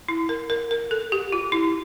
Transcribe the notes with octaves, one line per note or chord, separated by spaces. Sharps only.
E4
A#4
A#4
A#4
A4
G4
F4
E4